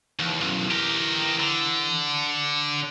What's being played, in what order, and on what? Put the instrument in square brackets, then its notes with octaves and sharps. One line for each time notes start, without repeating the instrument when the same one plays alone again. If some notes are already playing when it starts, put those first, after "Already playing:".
[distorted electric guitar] D#2 [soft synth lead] E3
[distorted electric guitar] B1 F#2
G4 A#4
D3
[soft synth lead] C#7